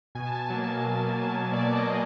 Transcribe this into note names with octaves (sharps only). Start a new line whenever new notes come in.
B2 G#5
A5
G#5
F#3 A#3
B2
F#3 A#3
B2 D5
D#5
F#3 A#3